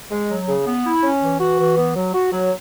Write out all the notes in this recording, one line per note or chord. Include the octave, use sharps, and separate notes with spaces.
G#3
F#3
C#3
B3
E4
C#4
E3
F#4
E3
B3
F#3
F#4
F#3